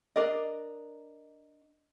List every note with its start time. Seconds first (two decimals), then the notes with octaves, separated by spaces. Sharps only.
0.16 D4 A#4 D5 D#5